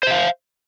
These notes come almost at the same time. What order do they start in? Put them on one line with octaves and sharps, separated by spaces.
C5 E5 F5